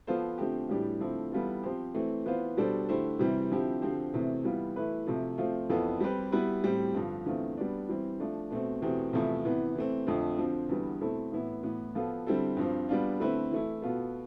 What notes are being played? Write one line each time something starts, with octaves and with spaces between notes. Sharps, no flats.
F3 B3 F4 A4 C5
D3 F3 A3 C4 G4
A2 E3 G3 D4 G4
D3 F3 A3 C4 E4
E3 G3 B3 F4 A4
F3 C4 G4 C5
E3 A3 C4
E3 B3 F4 C5
B2 G3 D4 A4 C5
D3 A3 E4 G4 C5
C3 E3 G3 C4 G4
D3 F3 C4 E4 G4
D3 F3 C4 G4 C5
E2 C3 E3 A3 C4
E3 G3 B3 F4
E3 A3 E4 B4
C3 F3 A3
F3 A3 C4 F4
F2 E3 B3 F4 A4
G3 C4 G4 B4
G3 B3 E4 B4
A2 G3 C4 G4
G2 D3 F3
E2 D3 A3 C4 F4
G3 B3 D4
E3 G3 C4
F3 A3 D4
B2 A3 C4
E2 B2 A3 C4 G4
E2 C3 F3 A3 E4
C3 E3 B3
E3 A3 C4
F2 D3 F3 A3
D3 F3 C4
E2 D3 G3 B3
B2 A3 C4 E4 A4
A2 E3 B3 E4
A2 E3 B3
F3 B3 F4 A4
D3 G3 C4 E4 A4
G2 F3 C4
G3 B3 D4 F4
D3 A3 C4 E4 B4
E3 A3 E4
B2 B3 F4 A4